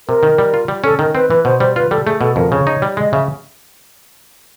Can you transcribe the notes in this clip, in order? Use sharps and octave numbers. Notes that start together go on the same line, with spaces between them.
C3 A#4
D#3
G3
F4
G3
C#4 A4
D#3 A#4
C4 B4
E3 B4
B2 C5
G3 C5
F4 B4
G3 A4
A3 G#4
B2 A4
F2 A#4
C#3 C#5
D#4
G3
G#3 D#5
C#3 E5